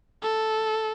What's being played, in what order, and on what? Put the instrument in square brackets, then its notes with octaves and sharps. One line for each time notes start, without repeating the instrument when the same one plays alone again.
[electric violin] A4